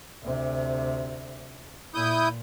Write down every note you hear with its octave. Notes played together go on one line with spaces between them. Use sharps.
D2 C3
A#2 E4 D#6 G6